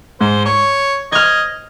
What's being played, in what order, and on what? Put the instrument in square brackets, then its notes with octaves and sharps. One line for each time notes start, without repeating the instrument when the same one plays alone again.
[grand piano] G#2 [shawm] C5
[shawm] C#5 [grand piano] C#6
[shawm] D#5 [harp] F6 G#6